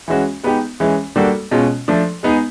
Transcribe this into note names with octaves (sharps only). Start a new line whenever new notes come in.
E3 G#3 C#4 F#4
G#3 B3 D#4 G4
E3 G#3 C#4
G3 A#3 D4 F#4 A4
B2 G#3 C#4 F4
F3 A3 D4
G#3 B3 D#4 G#4